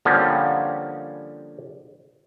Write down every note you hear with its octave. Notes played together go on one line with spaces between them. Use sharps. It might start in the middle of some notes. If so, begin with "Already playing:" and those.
D3 F3 G3 A#3 C4 C#4